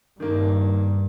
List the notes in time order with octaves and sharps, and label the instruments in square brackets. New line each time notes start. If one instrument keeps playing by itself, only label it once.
[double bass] G2 [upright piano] D#3 A#3